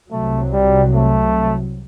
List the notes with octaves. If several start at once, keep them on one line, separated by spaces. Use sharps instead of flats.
C2 C3 F#3 A3
G3
A3